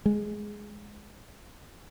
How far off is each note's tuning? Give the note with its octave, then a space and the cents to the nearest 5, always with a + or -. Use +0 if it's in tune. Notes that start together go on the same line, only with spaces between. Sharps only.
G#3 +5